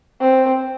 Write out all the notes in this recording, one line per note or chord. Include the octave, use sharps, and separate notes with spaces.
C4